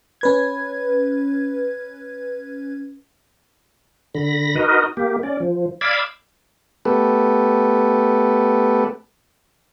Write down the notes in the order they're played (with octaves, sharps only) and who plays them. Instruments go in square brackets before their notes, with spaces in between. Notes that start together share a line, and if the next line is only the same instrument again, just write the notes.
[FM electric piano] C#4 B4 G#6
[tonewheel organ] D3 B5 A#6
D#4 F#4 A#4 B4 D#5
A#3 G4
C#4 D5
F3
D5 F5 B5 D6 E6 G#6
[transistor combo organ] A3 B3 G4 A4 B4